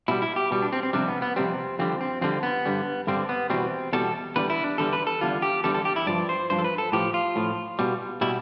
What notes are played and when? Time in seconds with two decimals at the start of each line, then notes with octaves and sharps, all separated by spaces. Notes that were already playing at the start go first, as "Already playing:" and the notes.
0.08 B2 G3 E4
0.22 E4
0.36 G4
0.51 B2 G3
0.62 D4
0.73 C4
0.83 C4
0.93 F2 C3 G3 D4
1.08 B3
1.22 B3
1.36 F2 C3 G3 C4
1.79 F2 D3 G3 C4
2.01 C4
2.21 F2 D3 G3 C4
2.43 B3
2.66 G2 D3 G3
3.07 G2 D3 G3 C4
3.29 B3
3.50 E2 B2 G3 C4
3.93 E2 B2 G3 A4
4.36 E2 D3 G3 B4
4.50 E4
4.64 D4
4.78 E2 D3 G3 A4
4.93 B4
5.07 A4
5.21 E2 D3 G3 F4
5.42 G4
5.64 E2 D3 G3 A4
5.74 A4
5.85 G4
5.96 E4
6.06 G2 F3 D5
6.29 C5
6.50 G2 F3 C5
6.59 A4
6.64 B4
6.78 A4
6.92 A2 F3 G4
7.14 F4
7.36 A2 F3
7.79 B2 G3
8.21 B2 G3 E4